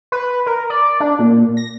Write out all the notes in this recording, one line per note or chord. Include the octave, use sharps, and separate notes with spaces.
B4
A#4
D5
D4
A#2
A#6